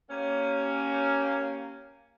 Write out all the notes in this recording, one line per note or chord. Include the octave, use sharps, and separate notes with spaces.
A#3 C#4 G4